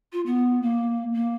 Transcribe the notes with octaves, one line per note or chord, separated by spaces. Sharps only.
F4
B3
A#3
A#3